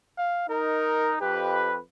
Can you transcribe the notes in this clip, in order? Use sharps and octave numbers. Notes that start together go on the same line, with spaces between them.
F5
D#4 A#4
F2 G4 B4